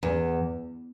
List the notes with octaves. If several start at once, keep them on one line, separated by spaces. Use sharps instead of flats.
E2